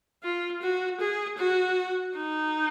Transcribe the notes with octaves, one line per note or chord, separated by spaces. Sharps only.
F4
F#4
G#4
F#4
D#4